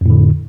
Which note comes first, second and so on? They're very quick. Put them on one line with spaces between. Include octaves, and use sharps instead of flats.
F2 A2 D3